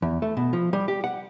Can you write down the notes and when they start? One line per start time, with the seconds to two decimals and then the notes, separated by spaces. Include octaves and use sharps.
0.02 E2
0.22 A3
0.37 B2
0.53 F3
0.73 G3
0.88 G4
1.04 F#5